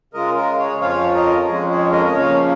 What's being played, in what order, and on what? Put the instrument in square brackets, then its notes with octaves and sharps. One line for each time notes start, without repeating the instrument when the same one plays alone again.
[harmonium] C#3 G#3 F4 A#4 D#5
F4 A#4
G#4 C#5
F2 F3 C#4 F4 C#5 F5
A#4 D#5
F2 F3 G#3 C#4 G#4
G#4
A#4 D#5
D#5
C#3 F3 A#3 C#4 C#5 F5